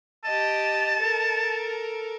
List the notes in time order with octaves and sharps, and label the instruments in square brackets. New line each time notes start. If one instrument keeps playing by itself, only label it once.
[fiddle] G4 D#5 [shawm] A5
[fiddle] A4 A#4